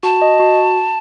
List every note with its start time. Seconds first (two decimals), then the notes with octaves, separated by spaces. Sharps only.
0.03 F#4 A5
0.22 D#5
0.39 F#4